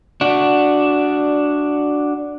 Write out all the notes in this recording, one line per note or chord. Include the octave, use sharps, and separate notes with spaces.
D4 F#4